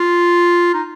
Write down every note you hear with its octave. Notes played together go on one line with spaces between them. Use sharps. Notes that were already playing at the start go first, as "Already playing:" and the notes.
Already playing: F4
D#4